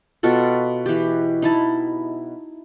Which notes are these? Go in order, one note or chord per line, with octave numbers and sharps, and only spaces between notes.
B2 F4 F#4 A4
E3 G4
D#4 E4 A5